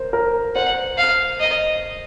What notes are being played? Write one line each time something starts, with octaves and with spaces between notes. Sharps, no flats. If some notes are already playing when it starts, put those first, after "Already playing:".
Already playing: A#4 C5
A#4
C5 F#5
F5
D#5